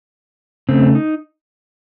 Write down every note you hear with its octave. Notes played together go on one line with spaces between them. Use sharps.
C#3 A3 C4
D#4